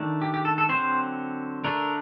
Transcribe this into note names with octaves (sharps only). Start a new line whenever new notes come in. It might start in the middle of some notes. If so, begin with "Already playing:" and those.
Already playing: D#3 A3 D4
G4
G4
A4
A4
D3 F#3 C4 C5
D3 A3 D4 A#4